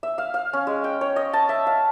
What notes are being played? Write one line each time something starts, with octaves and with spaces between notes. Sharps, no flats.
E5
F5
F5
C#4
G#3
G5
C#5
D#5
A5
E5
F5